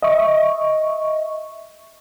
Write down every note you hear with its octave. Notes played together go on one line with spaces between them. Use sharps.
D#5 E5 C#6